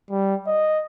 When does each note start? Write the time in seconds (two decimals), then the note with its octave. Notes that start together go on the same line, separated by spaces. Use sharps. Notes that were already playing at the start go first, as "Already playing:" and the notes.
0.10 G3
0.47 D#5